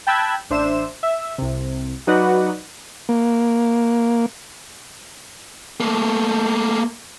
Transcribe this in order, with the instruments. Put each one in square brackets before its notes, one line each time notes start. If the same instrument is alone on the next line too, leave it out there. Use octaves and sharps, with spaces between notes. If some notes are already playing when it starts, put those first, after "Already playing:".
[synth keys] G5 A5 B5 E6 F#6 G#6
A1 D4 C5 E5 E7
E5
C2 C3
F#3 D#4 F#4 B4 D5 F#5
[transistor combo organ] A#3
[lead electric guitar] A3 A#3